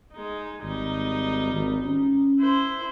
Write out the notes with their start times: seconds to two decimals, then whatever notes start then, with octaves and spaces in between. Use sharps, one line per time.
0.13 G#3 D#4
0.63 G#1 G3 D#4
1.54 G#1
1.85 C#4
2.40 E4 C5